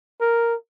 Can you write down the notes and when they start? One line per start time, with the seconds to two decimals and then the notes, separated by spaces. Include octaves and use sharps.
0.21 A#4